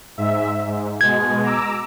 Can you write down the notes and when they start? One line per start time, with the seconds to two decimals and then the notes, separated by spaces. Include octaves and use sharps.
0.18 G#2 E5
0.66 G#2
1.01 B2 G#3 G#6
1.43 A#5 D6 E6